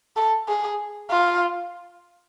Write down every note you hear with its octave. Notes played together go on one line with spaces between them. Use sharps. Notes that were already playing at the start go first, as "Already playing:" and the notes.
A4
G#4
F4